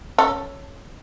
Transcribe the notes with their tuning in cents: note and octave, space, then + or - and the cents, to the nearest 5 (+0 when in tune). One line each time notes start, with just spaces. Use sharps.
C#4 +0 A4 +0